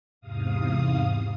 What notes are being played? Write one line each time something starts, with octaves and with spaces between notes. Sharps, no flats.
E2 G#2 C3 F5 D#6